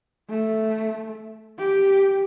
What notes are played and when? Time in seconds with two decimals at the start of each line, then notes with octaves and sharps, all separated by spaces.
0.30 A3
1.58 G4